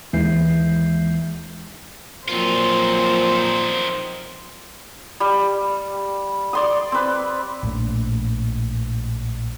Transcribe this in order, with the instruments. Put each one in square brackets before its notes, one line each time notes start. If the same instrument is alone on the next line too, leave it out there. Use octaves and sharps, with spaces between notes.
[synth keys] D#2 E3 G#3 E5 G6 C7
[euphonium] A#2 [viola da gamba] F3 F#3 C4 [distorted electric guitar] D#4 F4 [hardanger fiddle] C5
[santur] G3
D5 C6 D#6
C4 B4
[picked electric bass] A#1 A2